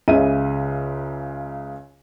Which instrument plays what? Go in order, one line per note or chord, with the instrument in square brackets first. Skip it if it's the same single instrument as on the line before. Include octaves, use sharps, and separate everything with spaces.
[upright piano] C#2 C#3 E5 D#7